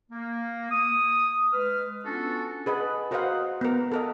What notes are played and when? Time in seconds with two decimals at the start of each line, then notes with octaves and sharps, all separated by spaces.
0.11 A#3
0.71 D#6
1.52 G#3 B4 F6
2.05 B3 C#4 D4 F4 F#4 A4
2.66 G#4 B4 D#5 F#5
3.11 F#4 A#4 C5 D#5 F5 F#5
3.61 B3 A#4
3.92 A4 A#4 D#5